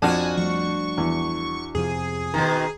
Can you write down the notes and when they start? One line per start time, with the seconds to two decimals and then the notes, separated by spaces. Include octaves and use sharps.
0.02 F2 D4 F#4 G#5 A5 F6
0.37 F3 G3 A3 C#6
0.98 E2
1.75 F2 C3 F3 G#4
2.34 B2 D#3 A#5